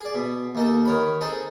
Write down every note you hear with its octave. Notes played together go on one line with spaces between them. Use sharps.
G#4 D5
B2
D#2 D#4 A4
D#3 C#5 B5
C4 D#4 G#4 A4